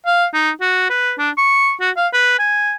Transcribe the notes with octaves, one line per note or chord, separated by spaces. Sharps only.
F5
D#4
F#4
B4
D4
C#6
F#4
F5
B4
G#5